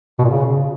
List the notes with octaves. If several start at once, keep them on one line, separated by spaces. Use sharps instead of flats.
B2
A#2
C#3